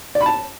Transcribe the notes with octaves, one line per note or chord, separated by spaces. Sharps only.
D5
B5
A5